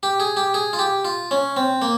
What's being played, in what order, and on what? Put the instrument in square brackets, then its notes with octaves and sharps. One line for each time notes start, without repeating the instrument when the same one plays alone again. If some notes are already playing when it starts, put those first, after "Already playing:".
[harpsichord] G4
G#4
G4
G#4
F4
G4
F4
C#4
C4
A#3